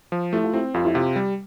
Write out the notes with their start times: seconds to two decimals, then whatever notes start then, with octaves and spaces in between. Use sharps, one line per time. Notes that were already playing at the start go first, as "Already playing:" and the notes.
0.12 F3
0.33 A3 E4
0.44 F4
0.54 C4 E4
0.74 F2 F4
0.85 E4
0.94 C3 F4
1.16 G3